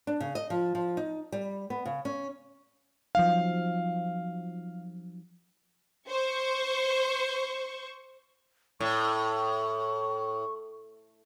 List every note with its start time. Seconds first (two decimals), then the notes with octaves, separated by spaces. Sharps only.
0.07 D4
0.20 C#3
0.35 D#5
0.50 F3
0.75 F3
0.97 D#4
1.32 G3
1.70 B3
1.86 C#3
2.05 C#4
3.15 F3 F#3 D#4 F5
6.09 C5 C#6
8.80 A2 C#6